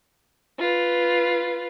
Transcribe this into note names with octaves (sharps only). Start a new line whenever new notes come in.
F4 B4